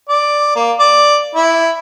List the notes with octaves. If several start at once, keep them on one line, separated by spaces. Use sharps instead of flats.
D5
A#3
D5
E4